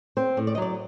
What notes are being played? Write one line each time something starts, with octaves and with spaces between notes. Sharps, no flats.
C4 C5
A2
D5
D#5
F#3 D5